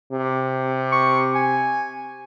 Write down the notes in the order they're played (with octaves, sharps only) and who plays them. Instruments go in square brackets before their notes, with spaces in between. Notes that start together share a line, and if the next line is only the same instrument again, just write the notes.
[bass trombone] C3
[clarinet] C#6
G#5